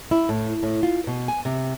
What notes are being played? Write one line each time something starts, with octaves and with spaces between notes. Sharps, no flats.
E4
A2
A2
F4
B2
G#5
C3